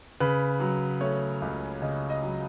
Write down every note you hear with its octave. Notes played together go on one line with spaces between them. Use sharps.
C#3 B4
F#3
A3 C#5
C#2
C#3 D#5
D#5
F#3